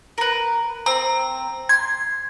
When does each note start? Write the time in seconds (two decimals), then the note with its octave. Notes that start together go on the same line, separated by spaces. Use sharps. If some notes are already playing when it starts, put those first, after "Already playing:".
0.18 A#4 B4
0.86 C4 A#5
1.69 C6 G#6